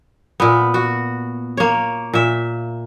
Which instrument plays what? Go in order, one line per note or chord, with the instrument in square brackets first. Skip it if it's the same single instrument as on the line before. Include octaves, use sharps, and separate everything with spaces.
[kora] A#2 B3
F#4
A#3 C#5
A#2 E5